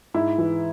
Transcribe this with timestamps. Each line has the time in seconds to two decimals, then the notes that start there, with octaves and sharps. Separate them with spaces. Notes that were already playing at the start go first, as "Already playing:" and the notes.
0.14 G#2 E4
0.38 E3